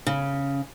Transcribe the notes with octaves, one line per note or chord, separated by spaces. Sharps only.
C#3